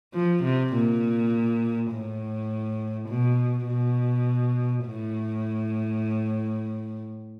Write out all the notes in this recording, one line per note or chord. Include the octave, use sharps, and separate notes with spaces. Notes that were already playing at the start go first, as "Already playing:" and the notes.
F3
C3
A#2
A2
B2
B2
A2